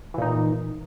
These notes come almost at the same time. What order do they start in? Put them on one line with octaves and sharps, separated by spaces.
E3 A#2 D#4